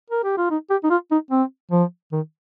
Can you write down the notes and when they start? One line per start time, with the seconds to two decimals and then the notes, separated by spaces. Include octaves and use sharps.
0.10 A#4
0.24 G4
0.37 F4
0.51 D#4
0.70 G4
0.84 D#4
0.90 F4
1.11 D#4
1.31 C4
1.71 F3
2.12 D#3